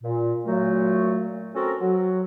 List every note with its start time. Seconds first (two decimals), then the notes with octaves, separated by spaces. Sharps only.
0.02 A#2
0.46 A#2 F#3 A3 F#4
1.55 C4 C#4 F#4 A4 A#4
1.80 F#3 F#4